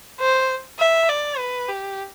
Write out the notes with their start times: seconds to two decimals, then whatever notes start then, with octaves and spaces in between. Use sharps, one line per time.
0.20 C5
0.79 E5
1.09 D5
1.38 B4
1.68 G4